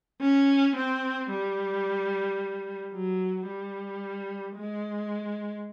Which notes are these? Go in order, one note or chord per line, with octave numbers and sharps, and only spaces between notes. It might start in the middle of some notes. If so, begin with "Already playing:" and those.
C#4
C4
G3
F#3
G3
G#3